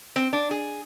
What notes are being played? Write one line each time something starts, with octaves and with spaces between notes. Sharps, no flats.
C4
D4
G#4